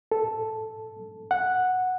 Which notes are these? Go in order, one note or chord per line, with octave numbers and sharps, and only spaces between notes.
A4
F#5